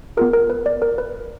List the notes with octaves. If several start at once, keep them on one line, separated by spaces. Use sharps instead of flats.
B3 F4 G#4 A#4
A#4
B4
D5
A#4
B4